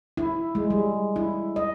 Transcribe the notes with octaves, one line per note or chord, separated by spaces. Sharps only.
E4
G#3
G3
E4
D#5